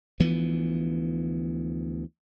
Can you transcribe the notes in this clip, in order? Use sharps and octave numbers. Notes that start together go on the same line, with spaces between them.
D2 E3 F3 B3